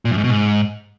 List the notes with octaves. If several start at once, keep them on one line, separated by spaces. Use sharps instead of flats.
A#2
F#2
G#2
B2
G#2